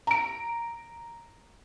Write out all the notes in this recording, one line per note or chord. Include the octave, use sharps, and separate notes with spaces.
A#5 D7